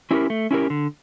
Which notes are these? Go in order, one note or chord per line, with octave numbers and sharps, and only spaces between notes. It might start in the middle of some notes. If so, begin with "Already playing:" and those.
C#4 E4 G4 A#4
A3
C#4 E4 G4 A#4
D3